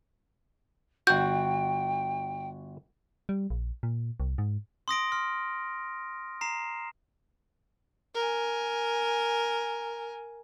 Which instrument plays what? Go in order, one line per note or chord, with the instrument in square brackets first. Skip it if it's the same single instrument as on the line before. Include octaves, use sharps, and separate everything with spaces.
[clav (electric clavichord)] G1 F#4 [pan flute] G5 [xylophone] G6
[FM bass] G3
A#1
A#2
C2
G#2
[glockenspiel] C6 D#6 A#6 D7
C6 F6
A#5 C7 E7
[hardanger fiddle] A#4 G#5